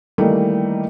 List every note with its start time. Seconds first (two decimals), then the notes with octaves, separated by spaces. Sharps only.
0.18 D#3 E3 G3 A3 A#3 D#4